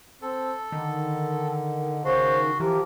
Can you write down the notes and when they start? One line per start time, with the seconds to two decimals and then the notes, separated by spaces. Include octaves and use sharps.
0.22 C4 A4
0.72 D3 D#3
2.05 C#3 F#4 C5 C6
2.60 E3 F3 G4 A#4